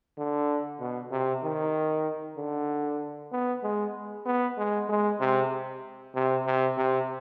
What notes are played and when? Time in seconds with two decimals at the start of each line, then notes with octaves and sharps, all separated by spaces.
0.18 D3
0.80 B2
1.11 C3
1.43 D#3
2.37 D3
3.32 B3
3.63 G#3
4.26 B3
4.57 G#3
4.89 G#3
5.20 C3
6.15 C3
6.46 C3
6.77 C3